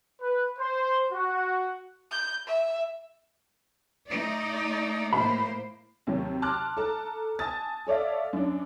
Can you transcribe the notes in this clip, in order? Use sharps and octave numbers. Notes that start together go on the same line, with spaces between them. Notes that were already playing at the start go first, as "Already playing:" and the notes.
B4
C5
F#4
G6
E5
A3 D#4 D5
A2 A#3 C5 B5
D#2 C3 D#3 F#3
A5 C6 D6 F6 F#6
A4 A5 A#5
G#5 A5 D#6 A6
A4 C#5 D5 E5 F5
F#2 D4